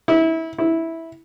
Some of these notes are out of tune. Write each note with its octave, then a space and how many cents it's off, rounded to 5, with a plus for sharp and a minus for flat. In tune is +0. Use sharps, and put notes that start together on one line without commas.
E4 -25
E4 -10